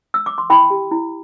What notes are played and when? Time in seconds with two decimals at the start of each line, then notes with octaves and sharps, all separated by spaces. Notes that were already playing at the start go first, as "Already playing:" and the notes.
0.14 E6
0.26 D6
0.38 C6
0.50 E4 G5 B5
0.70 G4
0.91 E4